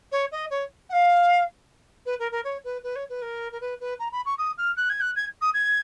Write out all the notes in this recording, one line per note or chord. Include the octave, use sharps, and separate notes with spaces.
C#5
D#5
C#5
F#5
F5
B4
A#4
A#4
C#5
B4
B4
C#5
B4
A#4
A#4
B4
B4
A#5
B5
C#6
D#6
F6
F#6
G#6
F#6
G#6
D#6
G#6